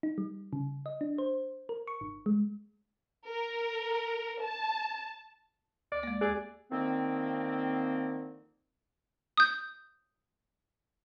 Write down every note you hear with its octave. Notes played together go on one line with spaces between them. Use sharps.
D#4
G3
C#3
D#5
D4
C5
A#4
C#6
G1
G#3
A#4
A5
D2 D5
G#3 A#3
D#2 G4 G#4 D5 F#6
D3 D#3 F3 A#3 C4
D#6 G6